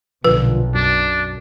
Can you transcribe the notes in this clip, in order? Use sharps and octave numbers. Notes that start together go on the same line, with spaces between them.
B1 A#2 D3 F3 B4
F#2 D4